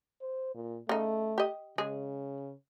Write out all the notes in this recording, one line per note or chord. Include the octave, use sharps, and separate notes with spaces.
C5
A#2
C#3 A3 D#4
G4 D#5
C#3 G#3 G#4